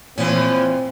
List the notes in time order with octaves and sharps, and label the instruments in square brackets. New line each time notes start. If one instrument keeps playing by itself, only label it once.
[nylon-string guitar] A#2 [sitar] E3 F3 C#4 [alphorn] C4